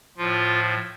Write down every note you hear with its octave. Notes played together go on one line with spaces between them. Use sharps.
A2 F3 F4